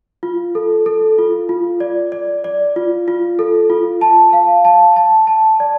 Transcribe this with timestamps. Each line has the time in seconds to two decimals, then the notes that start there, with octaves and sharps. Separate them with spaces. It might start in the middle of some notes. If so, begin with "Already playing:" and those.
0.23 F4
0.55 A4
0.86 A4
1.18 F4
1.49 F4
1.80 D5
2.12 D5
2.44 D5
2.76 F4
3.08 F4
3.39 A4
3.70 F4
4.01 A5
4.33 F5
4.65 A5
4.96 A5
5.27 A5
5.60 D5